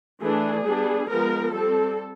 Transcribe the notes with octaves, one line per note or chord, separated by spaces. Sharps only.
E3 A3 D4 G#4
G3 B3 D4
F3 G#3 B3 A#4
G3 C4 A4